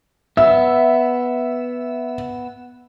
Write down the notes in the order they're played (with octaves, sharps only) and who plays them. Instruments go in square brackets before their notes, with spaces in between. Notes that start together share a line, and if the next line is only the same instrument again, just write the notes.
[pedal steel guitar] B3 E6 [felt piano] E5